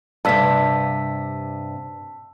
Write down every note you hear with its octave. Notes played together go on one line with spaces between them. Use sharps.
G2 C3 A5 E6 B6